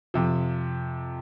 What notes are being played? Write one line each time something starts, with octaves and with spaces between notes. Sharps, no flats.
F2 C3 F3